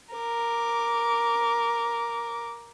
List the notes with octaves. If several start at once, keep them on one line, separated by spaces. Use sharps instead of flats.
A#4 D6